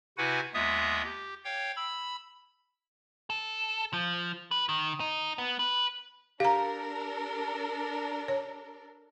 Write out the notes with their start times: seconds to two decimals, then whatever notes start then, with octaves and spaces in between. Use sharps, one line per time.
0.18 C3 E4 F#4 B4 F#5 G#5
0.54 D#2 G#3 B3 F4 E5 D#6
1.04 G4
1.45 C#5 F5 G5
1.76 B5 E6
3.30 A4
3.93 F3
4.51 B4
4.69 D#3
5.00 D#4
5.38 B3
5.59 B4
6.40 D4 G4 A4 A#4 F5 A#5
8.28 C#5